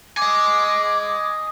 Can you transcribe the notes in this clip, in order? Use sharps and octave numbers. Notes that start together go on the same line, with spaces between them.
D#5 G#5 D6